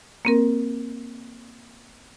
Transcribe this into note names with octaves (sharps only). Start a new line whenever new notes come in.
A#3 C4 A#4